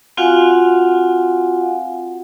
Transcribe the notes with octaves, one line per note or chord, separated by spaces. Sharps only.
C4 F4 F#4 F5 F#5 G#5